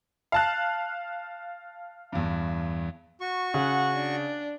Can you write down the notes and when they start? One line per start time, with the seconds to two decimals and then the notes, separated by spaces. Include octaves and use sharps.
0.32 F5 A5 F#6
2.12 E2 G2
3.21 F#4 C#6
3.54 C#3 F#5
3.95 D4